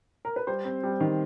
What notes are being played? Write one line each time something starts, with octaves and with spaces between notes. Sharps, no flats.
A#4
B4
G3 C5
C4
G3
D#3